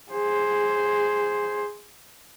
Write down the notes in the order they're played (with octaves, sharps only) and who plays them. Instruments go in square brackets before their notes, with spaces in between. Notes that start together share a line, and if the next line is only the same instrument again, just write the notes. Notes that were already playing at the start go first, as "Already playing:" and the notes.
[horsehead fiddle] G#4 C5